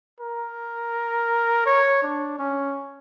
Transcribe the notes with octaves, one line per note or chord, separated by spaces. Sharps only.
A#4
C#5
D4
C#4